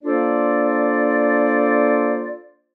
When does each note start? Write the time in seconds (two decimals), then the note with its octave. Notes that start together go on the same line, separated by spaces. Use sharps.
0.03 A#3 D4 F4 A4 C5 D5